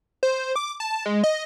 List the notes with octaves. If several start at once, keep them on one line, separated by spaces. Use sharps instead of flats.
C5
D6
A5
G#3
D#5